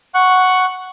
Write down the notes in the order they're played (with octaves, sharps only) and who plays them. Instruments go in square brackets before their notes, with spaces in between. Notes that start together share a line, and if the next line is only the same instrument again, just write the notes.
[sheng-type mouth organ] F#5 C#6 F#6